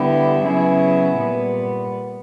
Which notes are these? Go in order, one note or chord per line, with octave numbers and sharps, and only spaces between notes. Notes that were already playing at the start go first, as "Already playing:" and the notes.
Already playing: D3 G3 B3 E4 G4
C#3 F#3 B3 E4 G#4
A#2 G3 B3